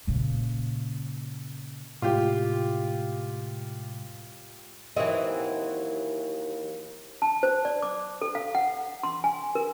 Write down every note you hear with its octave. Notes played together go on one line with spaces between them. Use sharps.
A#2 C#3
A2 C3 G#3 F4 G4
D#2 E3 F#3 C4 D#5 E5
A5
C5
D5
D6
A4
F5
F#5
C6
G#5
A#4